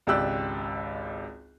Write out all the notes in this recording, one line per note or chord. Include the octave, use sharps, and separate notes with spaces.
G#1 C#2 G4 D5 E6 F#6